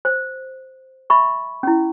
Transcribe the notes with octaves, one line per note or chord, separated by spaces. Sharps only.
C5
E5 B5 C#6
C#4 E4